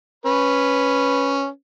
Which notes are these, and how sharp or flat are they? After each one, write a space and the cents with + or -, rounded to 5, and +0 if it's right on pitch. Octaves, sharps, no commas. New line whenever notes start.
C#4 +0 B4 +0